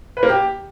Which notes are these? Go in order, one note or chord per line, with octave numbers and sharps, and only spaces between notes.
B4
A#3
G4